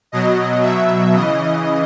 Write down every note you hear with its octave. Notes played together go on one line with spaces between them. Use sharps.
B2 F#3 D#5
B2 F#3 E5
C#3 E3 D#5